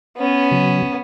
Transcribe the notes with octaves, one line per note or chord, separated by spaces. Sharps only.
B3 C#4
C#3 F#3